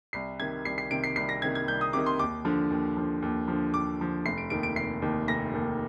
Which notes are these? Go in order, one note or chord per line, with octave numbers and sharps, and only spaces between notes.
C2 C7
C3 D#3 G#6
C2 C7
C7
C3 D#3 D7
C7
C2 C7
A#6
C3 D#3 G#6
G#6
C2 G6
D#6
C3 D#3 D6
C6
D#2 D6
D3 F3
D#2
D3 F3
D#2
D3 F3
D#2 D6
D3 F3
F1 C7
D7
D#2 D#3 D7
D7
F1 C7
D#2 D#3
F1 A#6
D#2 D#3